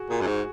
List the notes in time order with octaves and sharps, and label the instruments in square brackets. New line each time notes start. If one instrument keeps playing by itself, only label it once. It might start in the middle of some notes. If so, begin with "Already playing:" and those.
Already playing: [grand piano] F#4 G#4
[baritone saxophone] A#2 [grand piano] G#4
[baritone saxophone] F#2
[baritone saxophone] G#2 [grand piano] F#4